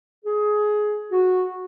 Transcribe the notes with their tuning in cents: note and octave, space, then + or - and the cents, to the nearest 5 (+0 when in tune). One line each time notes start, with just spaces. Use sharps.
G#4 +15
F#4 -10